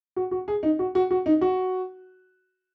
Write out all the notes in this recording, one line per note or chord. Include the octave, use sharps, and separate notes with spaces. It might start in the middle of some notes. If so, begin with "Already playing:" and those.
F#4
F#4
G#4
D#4
F#4
F#4
F#4
D#4
F#4